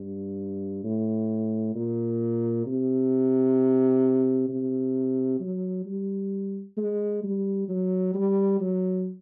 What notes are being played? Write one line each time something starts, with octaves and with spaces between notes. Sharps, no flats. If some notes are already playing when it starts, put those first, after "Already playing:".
Already playing: G2
A2
A#2
C3
C3
F#3
G3
G#3
G3
F#3
G3
F#3